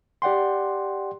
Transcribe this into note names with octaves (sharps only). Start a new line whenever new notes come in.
G4 D5 F#5 G5 C6